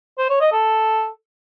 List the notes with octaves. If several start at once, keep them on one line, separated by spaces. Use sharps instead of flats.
C5
C#5
D#5
A4